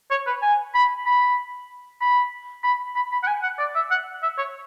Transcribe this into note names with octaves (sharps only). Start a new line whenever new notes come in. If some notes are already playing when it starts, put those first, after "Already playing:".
C#5
B4
G#5
B5
B5
B5
B5
B5
B5
F#5
G#5
F#5
D5
E5
F#5
E5
C#5